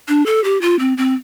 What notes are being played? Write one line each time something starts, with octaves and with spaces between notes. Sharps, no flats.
D4
A4
G4
F4
C4
C4